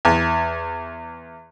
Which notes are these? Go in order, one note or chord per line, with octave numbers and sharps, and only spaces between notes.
E2